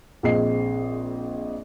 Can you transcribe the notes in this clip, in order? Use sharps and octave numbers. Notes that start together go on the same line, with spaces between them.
A#1 C4 G#4 D#5 C7